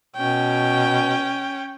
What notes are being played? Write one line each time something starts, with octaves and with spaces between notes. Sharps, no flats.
B2 C#4 G5